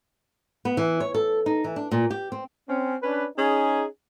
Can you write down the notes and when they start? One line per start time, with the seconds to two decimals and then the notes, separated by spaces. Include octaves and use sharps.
0.65 B3
0.77 E3
1.00 C#5
1.14 A4
1.46 D#4
1.64 E3
1.76 D4
1.91 A#2
2.10 G4
2.32 C4
2.69 C4 C#4
3.03 C#4 D4 B4
3.38 C#4 D#4 G#4